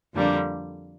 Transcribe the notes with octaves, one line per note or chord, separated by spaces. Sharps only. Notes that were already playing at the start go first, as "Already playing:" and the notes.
F2 D3 G3 A#3 D4